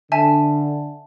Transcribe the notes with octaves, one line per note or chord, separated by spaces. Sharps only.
D3 E5 G#5 A5